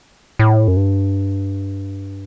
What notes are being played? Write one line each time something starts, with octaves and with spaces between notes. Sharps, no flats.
A2
F#2
G2